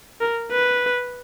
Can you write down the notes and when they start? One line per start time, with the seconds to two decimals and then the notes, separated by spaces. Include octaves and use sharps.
0.21 A#4
0.52 B4